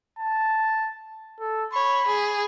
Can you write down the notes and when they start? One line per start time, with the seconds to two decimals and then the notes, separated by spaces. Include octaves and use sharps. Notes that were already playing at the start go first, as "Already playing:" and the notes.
0.19 A5
1.40 A4
1.73 C#5 B5
2.07 G#4